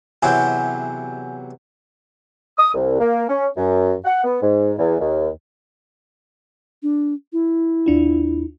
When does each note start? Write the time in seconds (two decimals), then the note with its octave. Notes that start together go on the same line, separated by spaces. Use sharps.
0.23 E2 C3 F#3 G#5 G6
2.58 D#6
2.74 C2
3.00 A#3
3.29 C#4
3.57 F#2
4.05 F#5
4.24 B3
4.42 G#2
4.78 E2
4.99 D#2
6.83 D4
7.33 E4
7.86 D#2 D4 F4